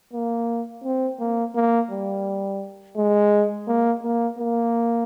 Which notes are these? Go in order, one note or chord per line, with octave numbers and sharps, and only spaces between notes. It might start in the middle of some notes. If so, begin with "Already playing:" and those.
A#3
C4
A#3
A#3
G3
G#3
A#3
A#3
A#3